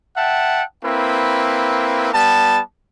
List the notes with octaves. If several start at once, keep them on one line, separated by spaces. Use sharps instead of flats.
E5 F#5 G5 A5
A#3 C4 E4 B4
G3 B3 A5